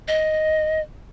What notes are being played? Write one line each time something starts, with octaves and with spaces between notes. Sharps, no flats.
D#5